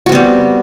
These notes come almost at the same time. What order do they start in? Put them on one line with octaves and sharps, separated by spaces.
F#4 C4 B3 G3